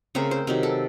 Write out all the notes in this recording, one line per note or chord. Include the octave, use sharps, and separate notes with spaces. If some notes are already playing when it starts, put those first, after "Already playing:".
C#3 A3 C4 A#4
C5
C3 D#3 F#3 A#4
A4